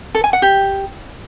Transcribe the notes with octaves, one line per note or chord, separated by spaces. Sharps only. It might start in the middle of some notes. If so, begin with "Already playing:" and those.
A4
G#5
F#5
G4